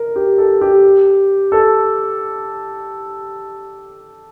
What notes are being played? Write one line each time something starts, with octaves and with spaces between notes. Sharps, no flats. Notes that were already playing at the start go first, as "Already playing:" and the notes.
Already playing: A#4
G4
A4
G4
A4